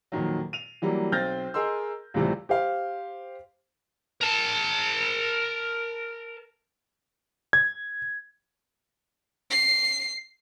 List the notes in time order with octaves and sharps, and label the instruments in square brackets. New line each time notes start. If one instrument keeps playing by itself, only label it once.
[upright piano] F2 A#2 D#3 F#3
D#7 F7
E3 F#3 G3 A#3
B1 C4 F6 G6 A6 A#6
G#4 A#4 D#5 C6 E6
C#2 A2 C3 E3 G3
[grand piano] G4 C5 F5
[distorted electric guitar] A#4 A5
[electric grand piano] G#6
[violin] C7